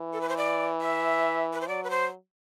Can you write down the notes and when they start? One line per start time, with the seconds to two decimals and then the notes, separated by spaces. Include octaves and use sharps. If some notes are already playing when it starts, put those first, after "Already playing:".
Already playing: E3
0.13 A4
0.21 B4
0.29 C5
0.37 D5
0.81 E5
1.53 B4
1.61 C5
1.68 F#3 D5
1.84 B4
1.90 C5